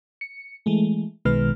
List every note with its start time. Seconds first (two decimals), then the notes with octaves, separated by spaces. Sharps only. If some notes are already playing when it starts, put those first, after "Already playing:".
0.21 C#7
0.66 E3 G#3 A3
1.25 B1 B2 D#3 G#3 B4 F6